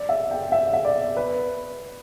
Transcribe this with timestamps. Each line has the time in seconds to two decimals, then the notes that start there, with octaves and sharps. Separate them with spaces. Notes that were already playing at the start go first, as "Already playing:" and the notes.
Already playing: D5
0.09 E5
0.31 G5
0.52 E5
0.73 E5
0.85 D5
1.17 B4